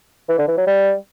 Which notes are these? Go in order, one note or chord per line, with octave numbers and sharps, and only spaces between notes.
E3
D3
E3
F#3
G3